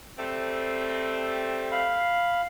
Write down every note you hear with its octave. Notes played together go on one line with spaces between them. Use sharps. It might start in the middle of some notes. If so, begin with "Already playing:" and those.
G3 A3 C4
F5 B5